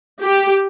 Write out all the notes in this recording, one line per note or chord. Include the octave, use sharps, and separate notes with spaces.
G4